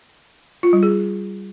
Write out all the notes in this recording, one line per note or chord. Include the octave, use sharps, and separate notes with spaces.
F4
G3
G#4